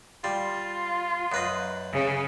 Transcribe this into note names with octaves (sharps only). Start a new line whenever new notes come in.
G3 F4
F#2 B4 D#5
C#3